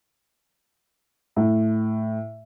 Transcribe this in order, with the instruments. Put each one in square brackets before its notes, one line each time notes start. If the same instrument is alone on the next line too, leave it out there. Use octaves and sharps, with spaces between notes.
[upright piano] A2